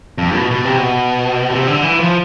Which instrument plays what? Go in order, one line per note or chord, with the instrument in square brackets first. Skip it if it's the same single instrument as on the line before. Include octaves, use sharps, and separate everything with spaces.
[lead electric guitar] F2
B2
B2
C3
B2
C3
D3
E3
F3